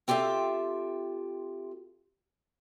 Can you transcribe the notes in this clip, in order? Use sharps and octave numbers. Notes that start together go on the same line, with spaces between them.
C4 F4 G4 A4 E5